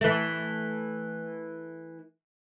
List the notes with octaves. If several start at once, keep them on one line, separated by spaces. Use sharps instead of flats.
E3 A3